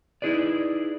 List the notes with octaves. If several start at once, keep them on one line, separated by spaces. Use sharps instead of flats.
D#4 E4 G#4 B4 D5